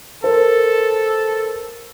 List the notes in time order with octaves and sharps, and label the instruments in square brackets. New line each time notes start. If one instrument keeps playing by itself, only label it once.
[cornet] A4 [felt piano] A#4 C5